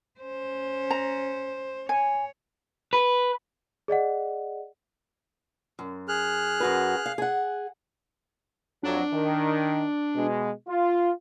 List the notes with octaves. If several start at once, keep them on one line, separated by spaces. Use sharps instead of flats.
C#4 C5
A#5
C#5 G#5
B4
G#4 D5 D#5 F#5
F#2
G#4 F6 F#6
F#2 F#4 B4
F5
G#4 F#5
F2 F#3 D4
D#3
B2 G#3
F4